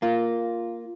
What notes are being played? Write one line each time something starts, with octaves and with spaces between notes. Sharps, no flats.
A#3 F4